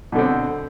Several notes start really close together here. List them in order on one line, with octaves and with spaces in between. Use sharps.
B2 D3 C4